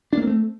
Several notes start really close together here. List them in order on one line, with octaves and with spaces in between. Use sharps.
D4 A#3 C4 A3